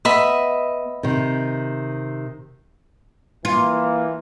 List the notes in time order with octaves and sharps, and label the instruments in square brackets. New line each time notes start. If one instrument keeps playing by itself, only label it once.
[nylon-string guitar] B3 [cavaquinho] D#5 E5 B5
[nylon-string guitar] C3 D#3
[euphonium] E3 [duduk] A#3 [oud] F4